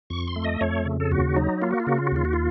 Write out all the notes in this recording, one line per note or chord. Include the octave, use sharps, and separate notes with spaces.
F2 C#6
C6
A3
D#5
F2 C#5
C#3
A4
D#2 F#4
F#3 D#4
A#3 F4
F#4
F4
C#3 F#4
F4
F#4
D#2 F4
F#4
F4